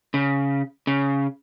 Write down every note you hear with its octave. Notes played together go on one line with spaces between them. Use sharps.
C#3
C#3